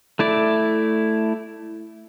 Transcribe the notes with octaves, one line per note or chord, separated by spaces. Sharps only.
A3 E4 D5